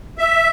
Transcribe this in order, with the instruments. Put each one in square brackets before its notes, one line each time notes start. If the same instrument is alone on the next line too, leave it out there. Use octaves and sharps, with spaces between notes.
[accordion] E5